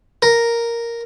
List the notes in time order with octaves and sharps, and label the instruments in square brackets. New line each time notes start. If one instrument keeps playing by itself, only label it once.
[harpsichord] A#4